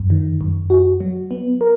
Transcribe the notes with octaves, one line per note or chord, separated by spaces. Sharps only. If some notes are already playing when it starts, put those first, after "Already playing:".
Already playing: F#2
D#3
F#2
F#4
F#3
B3
A#4